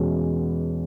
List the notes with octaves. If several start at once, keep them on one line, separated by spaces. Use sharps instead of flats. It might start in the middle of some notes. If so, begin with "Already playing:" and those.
Already playing: E2 B2 G#3 C#4